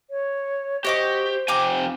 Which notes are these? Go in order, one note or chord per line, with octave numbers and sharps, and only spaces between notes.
C#5
F#4 G4 C5 D#5 D6
F2 C3 G5 G#5 A#5 D6